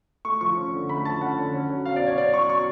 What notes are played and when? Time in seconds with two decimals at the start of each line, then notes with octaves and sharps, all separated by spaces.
0.25 A3 C#6
0.41 F3 C#6
0.57 C#4
0.73 D3
0.89 A3 B5
1.05 F3 A5
1.21 C#4 F#5
1.37 D3
1.54 C#4
1.70 F#3
1.85 B2 F5
1.96 D5
2.02 B2 C#5
2.18 C#4 D5
2.34 F#3 C#6
2.49 B2 C#6